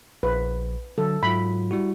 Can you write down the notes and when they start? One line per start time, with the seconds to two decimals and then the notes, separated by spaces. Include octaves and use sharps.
0.23 A#1 B4
0.98 D3 F#3 A4
1.23 G#2 F#3 F4 B5
1.71 G3 E4 F#4